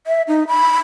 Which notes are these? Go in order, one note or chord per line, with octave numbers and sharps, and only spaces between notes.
E5
D#4
B5